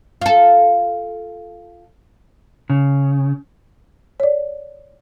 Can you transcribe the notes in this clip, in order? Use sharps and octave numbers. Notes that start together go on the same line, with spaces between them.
F4 A4
C#3
C#5 D5